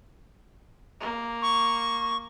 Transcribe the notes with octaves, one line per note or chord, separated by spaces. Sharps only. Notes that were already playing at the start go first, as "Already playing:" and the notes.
A#3
C#6